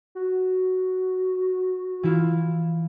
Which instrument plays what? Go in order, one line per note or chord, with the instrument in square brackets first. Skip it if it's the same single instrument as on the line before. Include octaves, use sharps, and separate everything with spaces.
[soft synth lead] F#4
[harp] E3 E4 F4